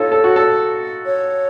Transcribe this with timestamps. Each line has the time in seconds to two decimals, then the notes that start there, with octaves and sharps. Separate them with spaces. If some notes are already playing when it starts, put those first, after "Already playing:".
Already playing: D#4 F4 A4 C#5
0.12 A4
0.24 F#4
0.36 A4
1.06 C#5